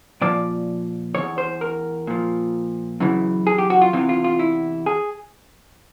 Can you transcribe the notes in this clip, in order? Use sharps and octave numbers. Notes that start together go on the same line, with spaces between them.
A#2 F3 D5
E2 B2 C#5
C5
A#4
A#2 F3
F#2 C#3 E3
G#4
G4
F#4
F4
E2 C3 E3 F4
F4
F4
E4
G#4